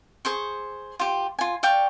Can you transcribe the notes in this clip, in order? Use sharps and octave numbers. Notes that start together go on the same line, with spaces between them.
G#4 C5 C#6
F4 G4
F4 G#5
D5 F5 G5 C#6